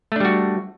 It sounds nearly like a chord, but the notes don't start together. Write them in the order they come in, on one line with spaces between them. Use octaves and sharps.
A3 D4 G3 F#4